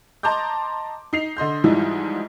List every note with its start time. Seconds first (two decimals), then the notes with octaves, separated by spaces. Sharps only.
0.23 D#5 A5 A#5 C6 D6 G6
1.13 D#4 C7 F7
1.37 D3 D#5 C6 G6
1.64 G#2 E3 F3 G3 D#4 E4